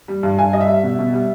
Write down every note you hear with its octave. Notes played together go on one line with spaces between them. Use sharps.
G3
G2
G2 G#5
G3 D#5
E5
G3
B2
B2
G3